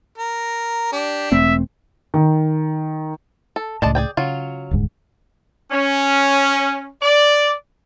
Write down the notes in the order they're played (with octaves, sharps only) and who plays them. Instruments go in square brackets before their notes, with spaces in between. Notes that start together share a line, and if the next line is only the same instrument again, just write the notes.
[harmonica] A#4
[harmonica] D4 [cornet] G4
[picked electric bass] E1 A3 C4 [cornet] E5
[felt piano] D#3
[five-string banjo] A4
[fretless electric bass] C#2 A2 [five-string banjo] G#3 D5 A5
[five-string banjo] G#4 D5 G5
[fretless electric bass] C#3 [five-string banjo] F#3 F4
[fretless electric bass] D#1 D2 G#2
[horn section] C#4
D5